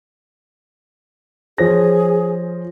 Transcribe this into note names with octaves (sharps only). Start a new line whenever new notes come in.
F3 G#4 C#5 A#6